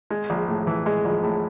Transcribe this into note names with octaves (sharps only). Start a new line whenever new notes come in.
G#3
A#1
A2
E3
G#3
A#1
A2